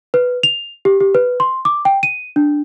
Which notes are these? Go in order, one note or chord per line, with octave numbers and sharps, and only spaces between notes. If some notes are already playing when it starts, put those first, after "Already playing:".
B4
F7
G4
G4
B4
C6
D6
G5
D#7
D4